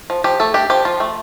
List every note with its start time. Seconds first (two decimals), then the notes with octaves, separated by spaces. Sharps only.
0.10 F3
0.24 F3 G4
0.40 A3 A4
0.54 D4 G4
0.70 F3 G4
0.85 F3 F4
1.00 A3